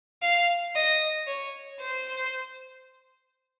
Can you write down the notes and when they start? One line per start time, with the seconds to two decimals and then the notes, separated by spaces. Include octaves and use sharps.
0.22 F5
0.76 D#5
1.27 C#5
1.80 C5